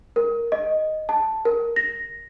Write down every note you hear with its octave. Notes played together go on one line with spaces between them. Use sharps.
A#4
D#5
A5
A#4
A#6